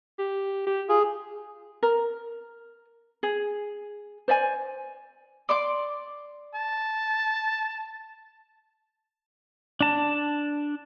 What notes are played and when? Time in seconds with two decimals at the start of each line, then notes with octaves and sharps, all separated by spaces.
0.19 G4
0.67 G4
0.89 F4 G#4
1.83 A#4
3.23 G#4
4.28 C5 D5 E5 G#5
5.49 D5 C6 D6
6.54 A5
9.81 D4 A5